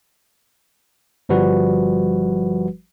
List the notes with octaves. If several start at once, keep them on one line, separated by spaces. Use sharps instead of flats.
G1 F3 G3 F#4 B4